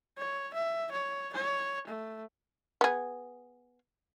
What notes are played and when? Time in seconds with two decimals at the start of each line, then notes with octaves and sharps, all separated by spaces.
0.18 C#5
0.54 E5
0.92 C#5
1.34 C#5
1.88 A3
2.81 B3 G#4